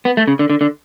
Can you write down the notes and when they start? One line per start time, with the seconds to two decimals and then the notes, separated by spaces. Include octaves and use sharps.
0.05 B3
0.17 A3
0.28 C#3
0.39 D3
0.50 D3
0.61 D3